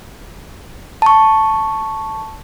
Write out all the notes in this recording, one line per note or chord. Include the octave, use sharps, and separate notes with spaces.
A5 C#6